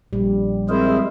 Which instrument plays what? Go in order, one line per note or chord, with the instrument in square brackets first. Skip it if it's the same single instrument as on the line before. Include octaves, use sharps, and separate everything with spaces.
[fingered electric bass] A#1 [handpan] G3
[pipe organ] G#3 G#4 A#4 [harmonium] C4 E4 C5